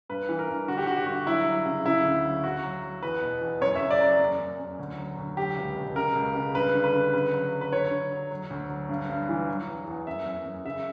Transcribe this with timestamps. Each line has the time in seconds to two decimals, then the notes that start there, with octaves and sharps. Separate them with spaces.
0.09 G2 B4
0.29 E3
0.39 A#4
0.48 G2
0.68 D3 F#4
0.78 G4
0.87 D3 F#4
0.97 G4
1.06 G2 F#4
1.26 F#3 E4
1.46 F#3
1.66 C#3
1.86 C#3 E4
2.05 D2
2.24 F#3
2.44 F#3 F#4
2.63 F#3
2.83 F#3
3.02 E2 B4
3.22 B2
3.41 E2
3.61 F#2 C#5
3.76 E5
3.81 C#3
3.91 D5
4.01 F#3
4.20 F#2
4.39 F#2
4.59 F#2
4.79 D2
4.98 F#3
5.18 D2
5.37 F#3 G4
5.57 C#2
5.77 B2
5.95 C#3 A#4
6.15 C#2
6.35 C#3
6.54 G2 B4
6.74 D3
6.84 B4
6.93 D3
7.13 C#3 B4
7.33 F#3
7.53 F#3
7.61 B4
7.72 D3 C#5
7.91 D3
8.11 F#3
8.31 F#3
8.50 D2
8.70 F#3
8.89 G2
9.09 G2
9.29 E3
9.48 F#3
9.68 E2
9.87 E2
10.07 F#2 E5
10.26 F#2
10.46 F#2
10.65 C#3 E5